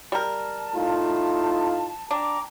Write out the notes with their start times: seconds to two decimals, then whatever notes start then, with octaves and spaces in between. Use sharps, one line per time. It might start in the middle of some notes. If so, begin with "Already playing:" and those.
0.12 G3 A#4 A5
0.74 A2 D#4 F4
2.11 D4 G5 A#5 D6